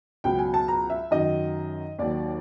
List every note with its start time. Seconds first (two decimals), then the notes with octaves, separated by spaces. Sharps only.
0.24 C#2 B2 F#3 G5
0.39 G#5
0.54 A5
0.68 A#5
0.90 E5
1.11 F#2 D#3 F#3 D#5
1.99 D#2 D#3 F#3 D5